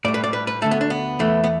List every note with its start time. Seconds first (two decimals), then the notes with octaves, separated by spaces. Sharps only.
0.05 A2 G3 D5
0.14 B4
0.24 D5
0.33 B4
0.47 B4
0.62 D2 D3 A3 A4
0.71 B3
0.81 D4
0.90 B3
1.19 E2 E3 A3
1.44 B3